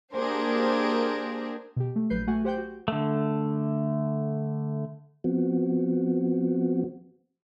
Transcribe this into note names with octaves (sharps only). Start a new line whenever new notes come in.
A#3 D4 G4 G#4 A#4 C5
B2 G4
A3
A#1 F#3 B4 G6 C7
A3 F#4 F#5 G#5
G4 C5 F#5 G5 G6
F#4
D3 A3
F3 B3 C4 F#4